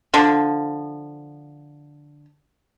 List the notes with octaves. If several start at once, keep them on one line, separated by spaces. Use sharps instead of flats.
D3 F3